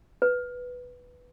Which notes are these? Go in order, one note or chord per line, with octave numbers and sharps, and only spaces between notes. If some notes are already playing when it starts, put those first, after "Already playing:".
B4